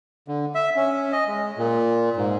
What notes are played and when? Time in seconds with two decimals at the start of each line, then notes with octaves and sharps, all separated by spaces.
0.28 D3
0.55 E5
0.76 C#4
1.12 D#5
1.27 G#3
1.58 A#2
2.17 G#2